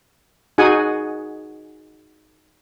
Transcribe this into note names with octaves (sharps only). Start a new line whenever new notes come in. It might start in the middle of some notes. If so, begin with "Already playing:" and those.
D#4 F#4 G#4 F#5 G#5